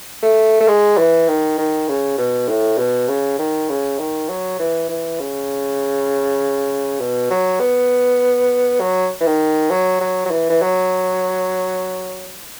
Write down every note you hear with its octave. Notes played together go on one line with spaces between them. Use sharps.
A3
A3
G#3
E3
D#3
D#3
C#3
B2
A2
B2
C#3
D#3
C#3
D#3
F#3
E3
E3
C#3
B2
F#3
B3
F#3
E3
D#3
F#3
F#3
F#3
E3
E3
F#3